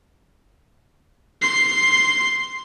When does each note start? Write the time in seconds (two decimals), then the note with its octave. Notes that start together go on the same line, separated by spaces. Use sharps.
1.42 C6 C7